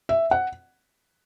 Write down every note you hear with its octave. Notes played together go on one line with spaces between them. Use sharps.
E5
F#5